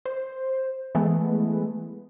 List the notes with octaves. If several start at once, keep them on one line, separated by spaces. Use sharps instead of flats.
C5
E3 G#3 A3 B3